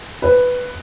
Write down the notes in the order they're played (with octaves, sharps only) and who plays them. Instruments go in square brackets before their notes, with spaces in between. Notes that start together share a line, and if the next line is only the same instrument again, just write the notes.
[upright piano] B4